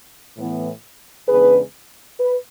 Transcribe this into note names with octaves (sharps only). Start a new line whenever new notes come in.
A2 E3 B3
E2 C#3 G#3 B3 D4 G#4 B4
B4